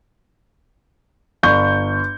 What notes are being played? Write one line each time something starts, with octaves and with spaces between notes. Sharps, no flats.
G1 C#6 G6